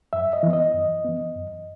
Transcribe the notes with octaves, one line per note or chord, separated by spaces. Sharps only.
F#2 E5
D#5
E3 B3
D#5
F#2
E3 B3
F#2